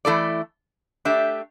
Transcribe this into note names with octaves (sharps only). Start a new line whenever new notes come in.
E3 A3 E4 A4 D5
A3 D4 G4 E5